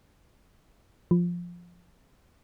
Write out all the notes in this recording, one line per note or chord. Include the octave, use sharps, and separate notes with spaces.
F3